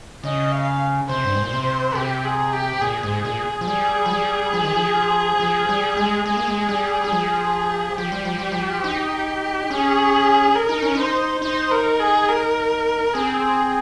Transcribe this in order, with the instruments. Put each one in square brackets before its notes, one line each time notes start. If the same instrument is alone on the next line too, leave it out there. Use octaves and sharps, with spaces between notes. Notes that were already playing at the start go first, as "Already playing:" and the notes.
[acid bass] C#3 [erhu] D#5
[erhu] F5
[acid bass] C3 [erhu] C5
[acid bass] G2
G#2
A#2
C3
[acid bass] C3 [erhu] G4
[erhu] G#4
G4
[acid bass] A#2 [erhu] G#4
[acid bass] G#2
A#2
F3
[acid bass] G3 [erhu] G#4
[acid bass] F3
G3
F3
D#3
F3
F3
G3
G#3
[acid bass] G#3 [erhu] G#4
[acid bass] A#3
G#3
G3
G3
F3
[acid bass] F3 [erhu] G4
[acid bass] G3
F3
G3
F3
D#4
[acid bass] C#4 [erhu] G#4
[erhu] A#4
[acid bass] D#4
C#4
[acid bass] D#4 [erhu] C5
[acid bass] D#4 [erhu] C5
[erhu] A#4
G#4
A#4
[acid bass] C4 [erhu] G#4
[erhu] G#4